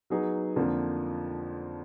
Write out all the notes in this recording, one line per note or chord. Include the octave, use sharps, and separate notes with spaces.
F#3 B3 D#4 G#4
F2 D3 F3 A#3 D4